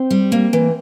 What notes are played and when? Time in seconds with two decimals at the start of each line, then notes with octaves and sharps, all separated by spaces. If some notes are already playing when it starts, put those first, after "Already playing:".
Already playing: C4 C5
0.11 G3
0.32 A#3
0.53 E3